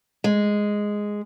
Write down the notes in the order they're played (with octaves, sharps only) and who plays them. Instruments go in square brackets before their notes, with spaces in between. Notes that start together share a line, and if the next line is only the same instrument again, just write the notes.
[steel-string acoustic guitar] G#3